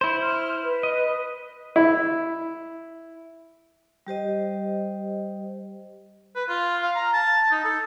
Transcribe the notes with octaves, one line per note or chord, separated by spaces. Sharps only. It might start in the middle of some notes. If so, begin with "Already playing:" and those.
E4 C5 C6
F6
B4
D#5
E4
G3 G4 C5 D#5
B4
F4
F5
A#5
A5
D#4
A4